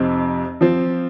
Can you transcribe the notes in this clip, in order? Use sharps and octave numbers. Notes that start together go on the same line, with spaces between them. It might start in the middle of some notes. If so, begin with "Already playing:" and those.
Already playing: F2 C3 C4 D#4
F3 C4